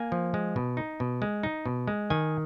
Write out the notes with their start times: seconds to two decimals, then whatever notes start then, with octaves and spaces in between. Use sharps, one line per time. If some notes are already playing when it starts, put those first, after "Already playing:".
Already playing: A#3 G#5
0.12 F3
0.34 G#3
0.56 B2
0.77 D#4
1.00 B2
1.22 G#3
1.43 D#4
1.66 B2
1.88 G#3
2.10 D#3 G#5